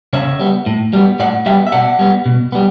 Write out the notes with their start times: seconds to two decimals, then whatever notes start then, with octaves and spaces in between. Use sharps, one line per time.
0.13 C#3 C#5 E5
0.40 G3 B3
0.66 A2
0.93 G3 B3
1.20 A2 D5 F#5
1.46 G3 E5 G5
1.51 B3
1.67 E5
1.72 B2 D5 F#5
1.99 G3 B3
2.26 B2
2.52 G3 B3